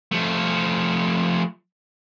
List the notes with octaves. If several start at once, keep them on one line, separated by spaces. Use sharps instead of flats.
F3 A3